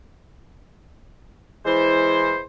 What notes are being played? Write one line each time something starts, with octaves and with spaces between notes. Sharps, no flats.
E3 G#3 E4 C5